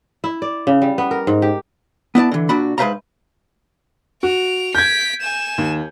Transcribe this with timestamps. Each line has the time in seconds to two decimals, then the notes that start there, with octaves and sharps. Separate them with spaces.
0.24 E4
0.42 D5
0.67 C#3
0.82 G3
0.98 B3
1.11 A#4
1.27 G#2
1.42 G4
2.15 B3 E4 D5 A5
2.32 D3 E3
2.49 A#2 D4 F#4 B5
2.78 G#2 B4 C5 E5 F5 A#5
4.23 F#4 D7 F7
4.75 G6 G#6 B6 D7
5.21 G#5 E7
5.58 D#2